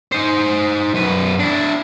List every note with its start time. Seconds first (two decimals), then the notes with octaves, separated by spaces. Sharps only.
0.12 D#4 C5
0.94 F#2 B4
1.39 D4 E4